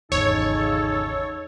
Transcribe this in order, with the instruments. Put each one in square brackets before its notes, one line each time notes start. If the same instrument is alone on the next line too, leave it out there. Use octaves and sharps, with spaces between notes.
[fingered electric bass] G#1 E2 [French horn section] C#3 D#4 [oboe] A4 [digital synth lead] C#5